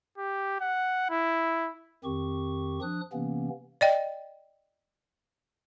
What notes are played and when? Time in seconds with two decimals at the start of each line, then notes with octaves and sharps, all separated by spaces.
0.18 G4
0.61 F#5
1.10 E4
2.04 F2 D#3 C4 G4 C#6
2.82 F3 D4 D#6 F#6
3.13 C3 E3 A#3 B3 C#4
3.81 D5 D#5 G5